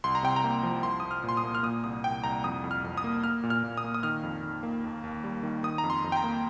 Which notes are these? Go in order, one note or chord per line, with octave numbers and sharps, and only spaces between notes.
C2 C6
A#5
C3 G5
A#5
A#3
F3
C2 C6
C2 D#6
F6
A#2
C6
D#6
A#3
F6
A#2 D#6
C2 D#6
C2 G5
C2 A#5
F2 D#6
F2
F6
F2
D#6
A#3
A#3 F6
A#2
F6
A#2
D#6
A#3
D#6
D#3 F6
F2
D#3
A#3
D#2
D#2
G3
D#3
D#3 D#6
A#5
F2
C6
F2
G5
A#5
A#3